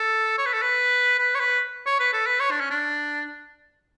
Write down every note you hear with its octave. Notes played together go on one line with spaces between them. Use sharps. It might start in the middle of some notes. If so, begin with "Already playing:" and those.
Already playing: A4
C#5
B4
A4
B4
B4
C#5
B4
C#5
B4
A4
B4
C#5
D4
C#4
D4